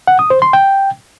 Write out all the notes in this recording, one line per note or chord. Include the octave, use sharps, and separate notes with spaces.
F#5
D#6
C5
C6
G5